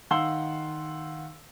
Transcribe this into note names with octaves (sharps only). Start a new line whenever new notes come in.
D#3 F5 F#5 C6 E6 G7